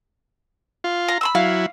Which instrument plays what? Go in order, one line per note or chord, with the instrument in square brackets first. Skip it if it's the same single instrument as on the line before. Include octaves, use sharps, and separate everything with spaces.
[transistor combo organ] F4
[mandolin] A#5
B5 C6 E6
[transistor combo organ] F#3 E4 [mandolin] F5